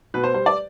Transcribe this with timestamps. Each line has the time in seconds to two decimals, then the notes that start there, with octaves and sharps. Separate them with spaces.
0.14 B2 B4
0.24 C5
0.34 G3 C5
0.46 D5